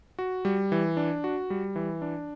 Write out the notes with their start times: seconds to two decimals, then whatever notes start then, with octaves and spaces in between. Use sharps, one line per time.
0.19 F#4
0.45 G3
0.72 E3
0.97 D4
1.24 F#4
1.50 G3
1.76 E3
2.02 D4